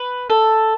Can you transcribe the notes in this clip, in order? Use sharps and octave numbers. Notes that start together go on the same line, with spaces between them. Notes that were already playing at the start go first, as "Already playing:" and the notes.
Already playing: B4
A4